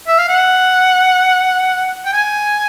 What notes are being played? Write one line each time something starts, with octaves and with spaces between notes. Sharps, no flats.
E5
F5
F#5
G5
G#5